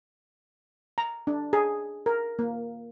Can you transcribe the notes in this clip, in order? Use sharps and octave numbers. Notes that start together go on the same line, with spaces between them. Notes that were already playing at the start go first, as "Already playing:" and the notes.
A#5
D4
G#4
A#4
A#3